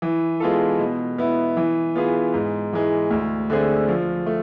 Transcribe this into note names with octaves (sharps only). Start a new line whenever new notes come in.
E3
G#3 B3 F4 A4
B2
B3 E4
E3
B3 F4 G#4
G#2
E3 G#3
D2
D3 A3 C4 G#4
F3
A3